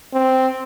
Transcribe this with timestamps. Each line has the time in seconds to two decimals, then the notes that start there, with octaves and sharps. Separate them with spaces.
0.14 C4